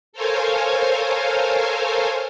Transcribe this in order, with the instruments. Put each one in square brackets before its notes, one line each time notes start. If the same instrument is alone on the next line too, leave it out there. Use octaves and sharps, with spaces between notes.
[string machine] A4 A#4 C5 C#5 F5 G#5